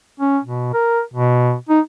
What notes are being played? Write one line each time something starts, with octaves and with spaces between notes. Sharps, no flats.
C#4
B2
A#4
B2
D#4